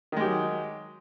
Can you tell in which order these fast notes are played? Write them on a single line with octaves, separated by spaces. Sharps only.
D#3 G#3 G4 F#3